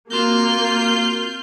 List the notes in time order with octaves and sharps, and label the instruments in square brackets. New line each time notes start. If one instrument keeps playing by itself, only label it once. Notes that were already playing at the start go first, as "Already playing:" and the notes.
[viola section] A#3 [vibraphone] C4 F#4 A#4 [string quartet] F4 F6 G6